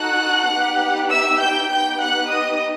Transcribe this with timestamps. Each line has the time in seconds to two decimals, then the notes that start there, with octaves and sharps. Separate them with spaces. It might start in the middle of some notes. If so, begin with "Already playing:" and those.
Already playing: D#4 F#4 A4 F#5 F#6
0.50 B3 D#4 G4
1.10 E5 E6
1.41 G5 G6
1.71 B3 D#4 G4 G5 G6
2.01 F#5 F#6
2.31 D#5 D#6